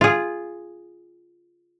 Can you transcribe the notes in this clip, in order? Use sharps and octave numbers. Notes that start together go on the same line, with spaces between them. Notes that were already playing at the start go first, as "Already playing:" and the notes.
F4 G#4